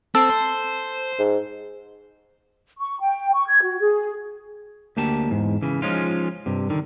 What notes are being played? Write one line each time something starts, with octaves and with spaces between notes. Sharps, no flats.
C4 A4
C5
G#2
C#6
G5
C#6
G#6
F#4
G#4
D2 A#3 G4 A5
E2 G#2
C#3 E3
F3 G#3 C#4 D#4 F4
G2 C3
D3 D#3